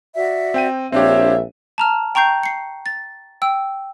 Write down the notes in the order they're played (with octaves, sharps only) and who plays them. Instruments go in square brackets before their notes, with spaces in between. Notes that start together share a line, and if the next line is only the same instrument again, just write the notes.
[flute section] F#4 D5 E5
[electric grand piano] C4 G5 D#7
[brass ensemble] A#1 E5 [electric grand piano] C4 D4 G4 [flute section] C#5 F5
[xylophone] A5 A#5 F6
G5 A#5 C#6 G6 C7
C7 C#7
A6
G5 E6